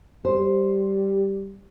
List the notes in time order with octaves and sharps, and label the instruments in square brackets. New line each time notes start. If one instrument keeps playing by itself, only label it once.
[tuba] G3 [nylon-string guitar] C5